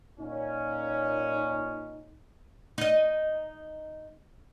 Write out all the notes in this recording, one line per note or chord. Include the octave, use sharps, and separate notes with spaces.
A#2 C#4 D#4
D#4 D#5